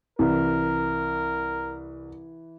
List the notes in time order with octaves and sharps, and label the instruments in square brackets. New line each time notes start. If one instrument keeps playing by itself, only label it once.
[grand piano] C2 [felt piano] E3 [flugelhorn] A#4